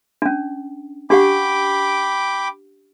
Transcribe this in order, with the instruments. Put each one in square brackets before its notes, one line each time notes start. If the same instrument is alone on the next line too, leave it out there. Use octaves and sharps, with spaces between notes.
[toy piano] C#4 D4
[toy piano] D4 G4 F#5 [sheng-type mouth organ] G5 B5 D6